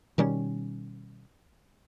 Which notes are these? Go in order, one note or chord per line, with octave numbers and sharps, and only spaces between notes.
B2 D#3 G3 C#4